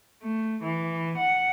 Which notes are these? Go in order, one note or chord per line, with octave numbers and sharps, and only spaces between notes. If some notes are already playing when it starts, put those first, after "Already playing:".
A3
E3
F#5